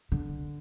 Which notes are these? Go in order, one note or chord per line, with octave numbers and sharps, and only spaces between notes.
D3